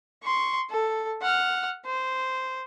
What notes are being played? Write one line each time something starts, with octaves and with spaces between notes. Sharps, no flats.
C6 C#6
A4
F#5 F6
C5